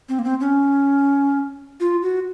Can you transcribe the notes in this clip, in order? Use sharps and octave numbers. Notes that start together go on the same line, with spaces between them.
C4
A#3
C4
C#4
F4
F#4